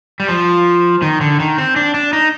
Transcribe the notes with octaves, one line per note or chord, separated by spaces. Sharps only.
G3
F3
D#3
D3
D#3
C4
D4
D4
D#4